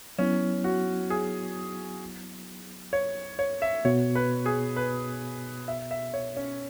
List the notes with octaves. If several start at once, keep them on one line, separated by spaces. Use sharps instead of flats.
F#3 B3 C#4 E4
F#4
G#4
C#5
C#5
E5
B2 B3 F#4 C#5
B4
G#4
B4
E5
E5
C#5
C#4